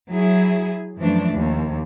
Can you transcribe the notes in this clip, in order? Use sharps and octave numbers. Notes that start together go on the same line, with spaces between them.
F#3 E4 G#4
F#2 E3 F3 A3 D4
D#2